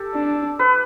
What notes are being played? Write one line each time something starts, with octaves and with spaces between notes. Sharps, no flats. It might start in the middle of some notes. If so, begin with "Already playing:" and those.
Already playing: G4 A4
D4
B4